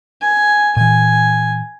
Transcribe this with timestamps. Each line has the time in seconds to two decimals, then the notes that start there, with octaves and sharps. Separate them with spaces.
0.21 G#5
0.77 A#2 E3 G#5